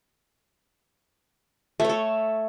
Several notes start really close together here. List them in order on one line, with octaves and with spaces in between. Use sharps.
A3 C#5 A4